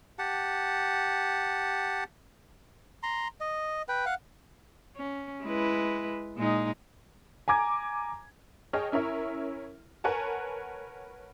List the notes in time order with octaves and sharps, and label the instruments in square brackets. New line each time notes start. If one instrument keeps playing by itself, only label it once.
[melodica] G4 F#5 A5
A#5 C6
D#5
B4 G5
F5 F#5
[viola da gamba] C#4
G#3 E4 B4
A#2 G#3 D#4
[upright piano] G#5 A#5 D6 G#6
[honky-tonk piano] G#4 C#5 D#5 G5 A5 F6
C#4 E4 A#4 C#5 E5
A#4 B4 C#5 F#5 G#5 A5